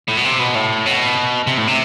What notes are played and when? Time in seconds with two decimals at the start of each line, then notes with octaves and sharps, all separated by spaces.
0.08 A2
0.17 B2
0.24 C3
0.39 B2
0.55 A2
0.86 B2
1.47 C3
1.58 A2
1.67 C3